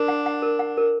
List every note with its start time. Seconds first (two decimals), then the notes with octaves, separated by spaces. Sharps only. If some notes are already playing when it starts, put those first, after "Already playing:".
Already playing: D4 A#4
0.08 F#5
0.26 F#5
0.42 A#4
0.59 F#5
0.77 A#4